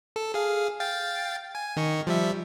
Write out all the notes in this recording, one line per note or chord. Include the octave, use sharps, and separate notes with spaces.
A4
G#4 F5
F5 G5 A6
G#5
D#3 D#4 C#6
F3 G3 E5